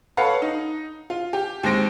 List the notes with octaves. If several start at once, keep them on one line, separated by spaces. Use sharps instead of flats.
A4 B4 C#5 F5 F#5
D#4
F4
G4
D#2 G#3 C4 A#6 D7